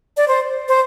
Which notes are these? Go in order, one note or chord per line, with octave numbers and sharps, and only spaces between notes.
D5
C5
C5